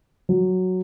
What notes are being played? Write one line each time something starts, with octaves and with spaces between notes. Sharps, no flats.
F#3